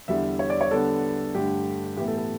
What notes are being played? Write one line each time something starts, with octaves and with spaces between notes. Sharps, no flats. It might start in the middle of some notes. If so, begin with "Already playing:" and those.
E2 D3 G3 E5
C#5
D5
C#5
D3 G3 B3 D4 A4
G2 D3 A3 G4
A2 E3 B3 G4
A4
A4